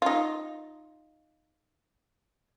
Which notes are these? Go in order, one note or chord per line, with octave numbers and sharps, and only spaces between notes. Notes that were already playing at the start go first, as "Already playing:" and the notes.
D#4 F4